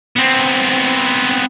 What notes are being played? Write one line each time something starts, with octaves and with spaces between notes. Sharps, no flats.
B3 C4